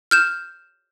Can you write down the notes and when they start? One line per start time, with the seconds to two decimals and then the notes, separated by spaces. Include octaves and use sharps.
0.11 F6 G6 E7